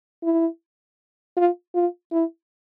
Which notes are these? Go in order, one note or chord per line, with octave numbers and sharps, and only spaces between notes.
E4
F4
F4
E4